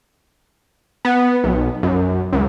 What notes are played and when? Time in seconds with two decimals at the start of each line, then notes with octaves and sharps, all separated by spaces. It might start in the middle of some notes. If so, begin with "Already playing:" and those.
1.05 B3
1.44 B1
1.83 F#2
2.33 C#2